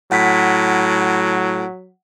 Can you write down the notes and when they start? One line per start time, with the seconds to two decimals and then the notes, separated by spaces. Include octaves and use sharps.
0.12 A2 F#3 F#5 B6